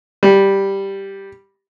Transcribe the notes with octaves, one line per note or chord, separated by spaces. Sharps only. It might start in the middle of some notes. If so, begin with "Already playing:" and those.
G3